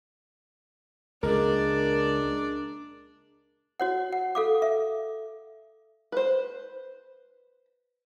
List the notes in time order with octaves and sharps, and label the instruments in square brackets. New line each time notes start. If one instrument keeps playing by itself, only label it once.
[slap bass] C#2 [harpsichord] A#2 G#3 [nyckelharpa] D4 D5 [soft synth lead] A#4
[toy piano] F#4 C#5 F#5
F#5
A4 F5 D6
E5
[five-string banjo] B4 C5